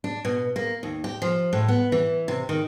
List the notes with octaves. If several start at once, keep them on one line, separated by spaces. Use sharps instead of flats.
D4
B2
A#3
D#2
G4
F3
A2
B3
E3
C3
D#3